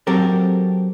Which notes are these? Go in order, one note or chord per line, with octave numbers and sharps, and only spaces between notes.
F#3 C4 G4 A4 A#4